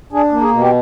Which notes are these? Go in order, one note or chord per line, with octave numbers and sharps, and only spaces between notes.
D4 G#4
A#3
G#4
B2
G4